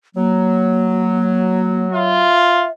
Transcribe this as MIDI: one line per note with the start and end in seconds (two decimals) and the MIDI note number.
0.16 2.27 54
0.16 1.88 58
1.92 2.67 65
1.92 2.71 76